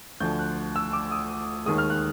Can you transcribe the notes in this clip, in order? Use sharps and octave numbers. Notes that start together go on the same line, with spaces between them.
D2 D3 F3 G6
F#6
E6
D6
D#6
D#2 D#3 G#3 D#6
F6
F#6